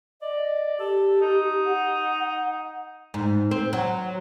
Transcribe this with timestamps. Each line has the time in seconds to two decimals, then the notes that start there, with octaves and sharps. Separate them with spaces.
0.22 D5 D#5
0.80 G4 A4
1.21 D#4
1.65 F#5
3.14 G#2
3.51 C4
3.73 F#3